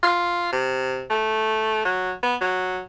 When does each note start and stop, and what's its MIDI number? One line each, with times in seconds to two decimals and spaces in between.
0.03 0.51 65
0.52 1.04 48
1.10 1.80 57
1.85 2.13 54
2.23 2.35 59
2.41 2.80 54